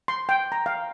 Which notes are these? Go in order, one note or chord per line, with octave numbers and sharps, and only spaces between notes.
C6
G5
A#5
F5